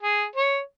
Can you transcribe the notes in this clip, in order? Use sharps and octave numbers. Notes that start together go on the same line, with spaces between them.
G#4
C#5